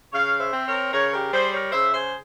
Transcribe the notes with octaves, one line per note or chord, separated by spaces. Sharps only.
C#3 C#5 F5
C5 E5
C4
A#4 C#5
C#3 A#4 C#5
G4 A#4
G3 G#4 C5
A#4 C#5
C#3 C5 E5
G#4 C5